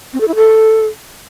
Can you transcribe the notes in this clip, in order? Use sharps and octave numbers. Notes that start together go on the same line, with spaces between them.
C4
A4
E4
A4